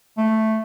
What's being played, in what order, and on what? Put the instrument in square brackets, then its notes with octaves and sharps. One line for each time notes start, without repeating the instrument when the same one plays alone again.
[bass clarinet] A3